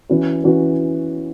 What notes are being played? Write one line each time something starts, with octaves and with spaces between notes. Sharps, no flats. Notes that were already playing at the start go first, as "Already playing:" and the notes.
E3 C#4 F#4 B4
E3 C#4 F#4 B4